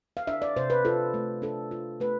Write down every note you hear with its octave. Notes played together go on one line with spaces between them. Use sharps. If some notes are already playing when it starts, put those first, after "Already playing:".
F5
D4 E5
D5
C3 C5
B4
F4 A4
A3
D4 A4
F4
A3 B4